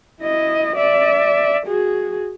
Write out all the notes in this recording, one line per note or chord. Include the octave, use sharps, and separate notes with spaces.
E4 D#5
D5 E5
F#4 G#4